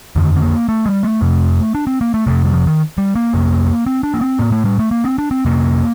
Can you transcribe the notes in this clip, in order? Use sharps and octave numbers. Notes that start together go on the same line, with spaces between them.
F2 D3 D#3
C4
A#3
A3
G3
A3
F2 C3
D4
C4
A#3
A3
F2 C3 A3
G3
F3
D#3
G3
A#3
F2 C3
C4
D4
A#3
C4
A2 A#3
A3
G3
A3
A#3
C4
D4
C4
F2 C3 A#3